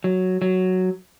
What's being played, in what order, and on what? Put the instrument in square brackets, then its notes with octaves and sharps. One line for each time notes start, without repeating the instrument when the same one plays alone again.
[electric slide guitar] F#3
F#3